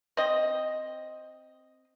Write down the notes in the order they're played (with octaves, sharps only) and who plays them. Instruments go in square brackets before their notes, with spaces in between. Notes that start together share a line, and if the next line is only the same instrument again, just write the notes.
[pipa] C4 D#5